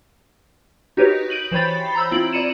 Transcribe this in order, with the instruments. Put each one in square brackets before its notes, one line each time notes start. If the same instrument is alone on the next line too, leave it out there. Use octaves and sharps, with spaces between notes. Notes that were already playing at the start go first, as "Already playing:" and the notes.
[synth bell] D#4 F#4 G4 A#4 B4 C#5
G6 D7 D#7 F#7
E3 C5 C#5 G5 B5 A6
A#5 B5 E6 G6
C4 E4 F4 D7 F#7
E4 D5 A#5 C#7 D#7 E7